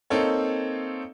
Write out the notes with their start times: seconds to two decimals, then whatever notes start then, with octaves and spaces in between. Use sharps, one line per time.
0.10 A#3 C4 D#4 A4 C#5